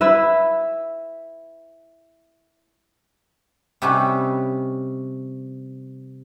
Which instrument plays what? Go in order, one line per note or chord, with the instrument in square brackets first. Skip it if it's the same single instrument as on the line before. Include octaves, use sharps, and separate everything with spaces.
[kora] E4 B4 E5
[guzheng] C3 G3 C#4 D#4 G4 B4